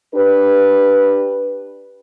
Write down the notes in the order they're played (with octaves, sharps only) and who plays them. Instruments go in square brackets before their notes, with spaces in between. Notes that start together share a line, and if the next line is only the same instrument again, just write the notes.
[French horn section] D4 G4 B4